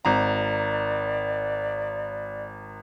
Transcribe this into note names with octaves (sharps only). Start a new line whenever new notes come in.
G#1 D5 A#5